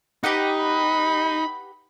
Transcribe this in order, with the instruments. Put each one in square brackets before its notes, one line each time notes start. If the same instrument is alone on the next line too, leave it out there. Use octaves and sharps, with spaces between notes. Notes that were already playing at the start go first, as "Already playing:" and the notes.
[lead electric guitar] D#4 [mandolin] G4 B4 F#5
[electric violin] B5